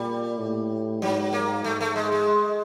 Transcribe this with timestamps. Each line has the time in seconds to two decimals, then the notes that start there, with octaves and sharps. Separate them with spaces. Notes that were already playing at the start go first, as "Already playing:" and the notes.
Already playing: A#2 G3
0.38 A2
1.02 G#2 F#3
1.33 A#3
1.64 G#2 A3
1.81 A3
1.96 G#3
2.12 G#3